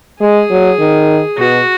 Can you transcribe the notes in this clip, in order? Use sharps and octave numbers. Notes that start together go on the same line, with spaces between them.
G#3 G#4
F#3
D#3
B2 F#4